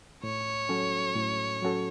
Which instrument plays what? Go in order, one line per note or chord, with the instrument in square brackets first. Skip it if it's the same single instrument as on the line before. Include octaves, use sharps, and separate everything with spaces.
[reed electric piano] A2 [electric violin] C#5
[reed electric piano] F#3 C#4 F#4 A4
A2
F#3 C#4 F#4 A4